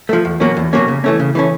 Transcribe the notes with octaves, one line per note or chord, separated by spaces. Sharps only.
F3 A3
E2
B2 F#3 A#3 C#4
E2
B2 F#3 A#3 C#4
C#3
E3 A3 C#4
C#3
E3 A3 C#4